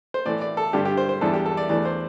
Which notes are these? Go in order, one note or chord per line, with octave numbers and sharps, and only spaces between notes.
C5
A2 E3 A3 D5
D5
A4
G2 D3 G3 G4
G4
C5
C5
E2 E3 G3 D4 A4
G4
A4
D5
E2 E3 A3 D4 D5
C5